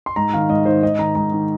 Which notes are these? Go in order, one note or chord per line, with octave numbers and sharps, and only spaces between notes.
C6
G#2 A#5
D#3 F5
G#2 D#5
D#3 C5
G#2 D#5
D#3 A#5
G#2 A#5
D#3